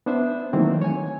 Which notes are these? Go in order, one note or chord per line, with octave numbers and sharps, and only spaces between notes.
B3 D4 C5 E5
D#3 E3 F#3 A3 A#3 C4
C#5 G#5